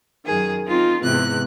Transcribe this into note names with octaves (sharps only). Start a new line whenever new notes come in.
F#2 D#3 G#4
C4 D#4 F4
E2 G#2 C3 F#6